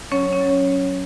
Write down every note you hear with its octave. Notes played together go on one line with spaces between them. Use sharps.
F#3 C#4 C#5
C#4 C#5
F#3